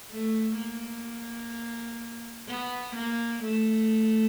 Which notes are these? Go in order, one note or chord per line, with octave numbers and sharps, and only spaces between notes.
A3
A#3
B3
A#3
A3